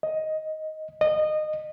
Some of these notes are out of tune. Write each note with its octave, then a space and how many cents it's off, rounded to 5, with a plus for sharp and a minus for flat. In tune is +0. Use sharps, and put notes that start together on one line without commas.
D#5 +10
D#5 -20